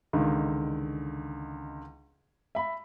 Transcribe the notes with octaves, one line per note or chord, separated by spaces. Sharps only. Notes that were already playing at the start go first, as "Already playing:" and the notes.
C#2 D3 D#3
E5 B5